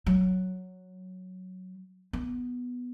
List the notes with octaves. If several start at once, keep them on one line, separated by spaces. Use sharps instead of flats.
F#3
B3